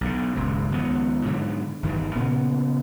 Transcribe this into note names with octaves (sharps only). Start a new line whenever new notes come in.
B1 D3
D#1 C#2 G2
C#2 D#3 F3 B3
G#2 B2 D3 F#3
G1 D#3 E3 G3
A#2 C#3 A#3 B3